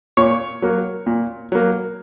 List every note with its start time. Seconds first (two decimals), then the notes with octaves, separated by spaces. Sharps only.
0.17 A#2 C#5
0.62 F#3 A#3
1.06 A#2
1.52 F#3 A#3